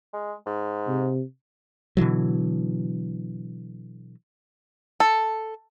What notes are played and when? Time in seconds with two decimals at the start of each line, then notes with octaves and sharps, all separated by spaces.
0.13 G#3
0.46 G#2
0.87 C3
1.97 B2 D3 E3 F#3
5.00 A4